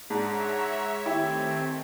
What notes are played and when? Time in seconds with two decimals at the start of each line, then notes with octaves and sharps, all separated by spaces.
0.10 G#2 D4 C#5 E5 F#5 A5
0.45 F#5 A#5
1.06 D#3 A3 C4 E4 G4 G#5